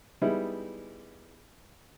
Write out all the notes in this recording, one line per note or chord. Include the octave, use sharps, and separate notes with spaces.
G3 G#3 B3 D#4 E4